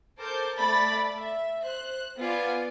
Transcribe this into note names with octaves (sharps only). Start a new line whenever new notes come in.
A4 A#4 C5 A5 D6 G6
A3 D5 B5 A6
E5
C5 F#6
B3 F4 D5 F5 G#5